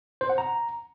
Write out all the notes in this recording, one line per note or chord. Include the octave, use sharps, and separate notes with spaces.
C5
F#5
A#5